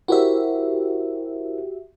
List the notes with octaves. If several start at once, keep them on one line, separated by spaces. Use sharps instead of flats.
E4 F#4 G4 A#4 C5 E5